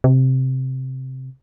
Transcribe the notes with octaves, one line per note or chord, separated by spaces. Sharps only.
C3